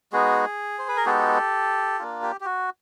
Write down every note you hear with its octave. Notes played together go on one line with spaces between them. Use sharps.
G#3 B3 D#4 F#4 G#4
C5
B4
A#4
G#3 B3 D#4 F#4 G4 A4
A#3 D4 F4
G4
G4
F#4